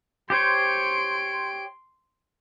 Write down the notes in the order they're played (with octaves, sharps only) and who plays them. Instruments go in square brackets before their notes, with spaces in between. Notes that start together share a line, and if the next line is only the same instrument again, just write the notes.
[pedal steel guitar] G4 C5 C#5 [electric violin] C6 D7